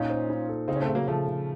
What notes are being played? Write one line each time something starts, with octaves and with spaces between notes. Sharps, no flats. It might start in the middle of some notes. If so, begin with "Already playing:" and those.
Already playing: A#2 C#4 D#4 F4
C5
D#4
A4
C#3 C4 D#4
C#4
A3 C4
C#3
F#3 A#3
C#3 F3 A3
C#3